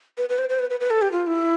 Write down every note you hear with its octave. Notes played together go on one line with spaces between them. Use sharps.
B4
B4
C5
C5
B4
B4
B4
A4
G4
F4
E4